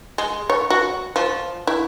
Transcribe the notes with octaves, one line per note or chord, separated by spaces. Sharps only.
G#3
C#5
F#4
F3
E4